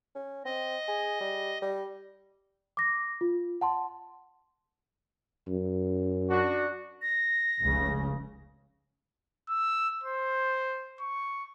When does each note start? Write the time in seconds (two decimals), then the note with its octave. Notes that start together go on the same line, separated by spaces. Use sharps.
0.15 C#4
0.45 C4 D#5
0.88 G#4
1.20 G3
1.62 G3
2.77 D6 A#6
3.21 F4
3.61 F#5 A5 C6
5.48 F#2
6.30 D4 F#4
7.02 A#6
7.61 F1 C#2 C#3
9.49 E6
10.04 C5
11.01 C#6